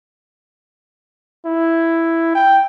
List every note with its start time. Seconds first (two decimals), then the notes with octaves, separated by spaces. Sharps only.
1.46 E4
2.35 G5